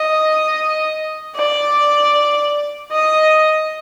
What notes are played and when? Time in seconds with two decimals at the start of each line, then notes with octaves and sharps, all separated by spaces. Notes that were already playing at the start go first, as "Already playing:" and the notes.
Already playing: D#5
1.36 D5
2.92 D#5